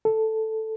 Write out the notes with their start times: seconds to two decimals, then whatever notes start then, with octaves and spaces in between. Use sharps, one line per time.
0.05 A4